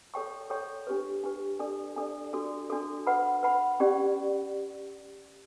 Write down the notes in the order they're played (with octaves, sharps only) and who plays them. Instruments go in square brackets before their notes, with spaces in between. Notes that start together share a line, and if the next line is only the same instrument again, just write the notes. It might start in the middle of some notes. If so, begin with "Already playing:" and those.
[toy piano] A4 C#5 G5 C#6
A4 C#5 G5 C#6
D4 G4 B4
D4 G4 B4
D4 A4 D5
D4 A4 D5
D4 F#4 A4
D4 F#4 A4
B4 F#5 B5
B4 F#5 B5
C#4 G4 D5